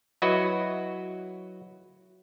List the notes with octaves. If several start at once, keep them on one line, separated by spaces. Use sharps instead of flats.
F#3 E4 F#4 B4 D#5